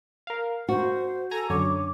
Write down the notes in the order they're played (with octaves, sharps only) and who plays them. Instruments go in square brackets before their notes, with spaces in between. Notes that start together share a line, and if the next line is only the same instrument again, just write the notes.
[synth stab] A#4 F5
[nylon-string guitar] F#4 [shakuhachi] C5
[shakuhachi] A4 [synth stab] G#5 A#5
[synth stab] F#2 D3 C#5 [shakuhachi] D6